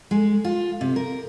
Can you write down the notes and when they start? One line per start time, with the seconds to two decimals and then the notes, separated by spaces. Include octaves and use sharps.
0.11 G#3
0.44 F4
0.81 C3
0.96 A#4